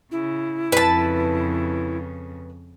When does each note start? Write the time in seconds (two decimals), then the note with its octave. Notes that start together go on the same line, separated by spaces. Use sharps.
0.11 C#3 E4
0.72 F2 C#3 B4 A5